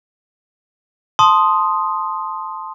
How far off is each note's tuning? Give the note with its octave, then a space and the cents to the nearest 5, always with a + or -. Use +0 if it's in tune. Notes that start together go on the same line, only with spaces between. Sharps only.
A5 +0 C6 +0 D#6 +0